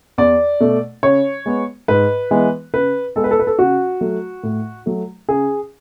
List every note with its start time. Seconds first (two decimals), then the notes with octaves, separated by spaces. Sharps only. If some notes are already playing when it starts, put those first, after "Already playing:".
0.18 E2 D5
0.61 B2 A3
1.03 C#3 C#5
1.46 G#3 B3
1.88 G#2 B4
2.31 E3 G#3 B3
2.74 C#3 B4
3.16 G#3 B3 A4
3.24 B4
3.31 A4
3.39 B4
3.47 A4
3.59 C#3 F#4
4.01 F#3 A3
4.43 A2
4.86 F#3 A3
5.29 C#3 G#4